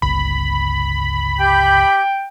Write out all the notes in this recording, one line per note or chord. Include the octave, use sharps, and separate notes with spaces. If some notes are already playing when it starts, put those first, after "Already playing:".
G1 C#2 B5
G4 G5 D6 G6